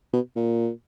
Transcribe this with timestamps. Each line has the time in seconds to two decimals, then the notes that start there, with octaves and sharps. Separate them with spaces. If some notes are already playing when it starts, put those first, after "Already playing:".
0.13 B2
0.36 A#2